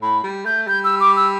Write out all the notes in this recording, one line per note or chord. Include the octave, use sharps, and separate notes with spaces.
A2 B5
G3
A3 G6
G3 G6
E6
D6
E6